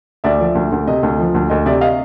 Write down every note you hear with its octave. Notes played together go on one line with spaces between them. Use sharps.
D2 D5 E5
F3
D2
D2
C3 D#5
D2
F3
D2
D2 D#5
C3 D5 E5
D#5 F5